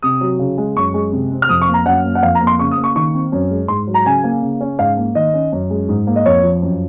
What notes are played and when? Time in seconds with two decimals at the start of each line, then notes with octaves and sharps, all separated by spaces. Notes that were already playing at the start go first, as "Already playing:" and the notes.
0.03 C3 D#6
0.21 F#3
0.39 C#3
0.58 G#3
0.76 F#2 C#6
0.94 G#3
1.12 C3
1.31 C4
1.42 F6
1.49 F2 D#6
1.62 C#6
1.68 A#3
1.74 A#5
1.86 F#2 F#5
2.04 A#3
2.15 F#5
2.23 F2 F5
2.35 A#5
2.41 A#3
2.47 C6
2.59 C#3 C#6
2.71 D#6
2.77 A#3
2.84 C#6
2.95 D#3 C#6
3.14 C4
3.32 F#2
3.50 G#3
3.68 G#2 C6
3.87 F#3
3.94 A#5
4.06 C#3 G#5
4.24 A#3
4.42 C#3
4.61 C#4
4.79 G#2 F5
4.97 A#3
5.15 D#3 D#5
5.34 C#4
5.52 F#2
5.70 G#3
5.89 G#2
6.07 A#3
6.16 D#5
6.26 F2 C#5
6.43 F3
6.62 F#2